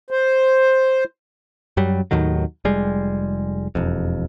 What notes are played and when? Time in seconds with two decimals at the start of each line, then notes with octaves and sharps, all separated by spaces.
0.11 C5
1.77 F#2 F#3 G3
2.11 D#2 A2 D#3 F#3
2.65 F1 G3 G#3
3.75 E1 F2